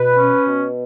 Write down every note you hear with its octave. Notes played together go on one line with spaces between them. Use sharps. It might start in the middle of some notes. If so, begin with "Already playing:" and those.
Already playing: B2 B4
C#4
B2